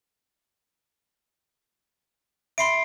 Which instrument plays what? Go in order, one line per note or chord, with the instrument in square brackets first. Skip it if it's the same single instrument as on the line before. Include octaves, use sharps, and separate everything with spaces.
[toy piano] E5 B5 [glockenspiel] C6 C7 D7